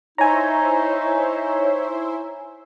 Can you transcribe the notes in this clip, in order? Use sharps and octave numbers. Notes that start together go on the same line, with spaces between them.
D#4 E4 C5 C#5 E5 G#5 A#5